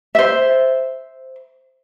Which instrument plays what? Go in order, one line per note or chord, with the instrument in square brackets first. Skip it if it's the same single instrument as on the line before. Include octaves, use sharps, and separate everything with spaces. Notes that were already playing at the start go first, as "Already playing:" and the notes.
[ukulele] C5 E5